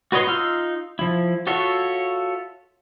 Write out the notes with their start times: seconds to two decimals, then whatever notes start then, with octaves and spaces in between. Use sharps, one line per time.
0.12 F#4 B4 C#5 D#5 C6
0.27 D#4 F4 C6 E6 F6
0.99 F3 E4
1.47 F4 F#4 A4 C#5 E5